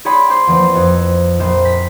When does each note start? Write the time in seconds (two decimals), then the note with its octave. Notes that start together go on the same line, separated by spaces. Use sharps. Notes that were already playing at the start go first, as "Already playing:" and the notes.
0.05 G#4 C#5 D5 G5 B5 C6
0.30 C5 G5 C6 D6
0.47 E2 F3 A#3 C4
0.75 F2
1.39 A#1 C5
1.64 G5 B6